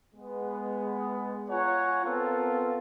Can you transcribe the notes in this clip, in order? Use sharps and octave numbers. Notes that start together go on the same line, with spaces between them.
G#3 B3
F4 C#5 F#5 G#5 A#5
B3 C4 F4 A4 A#4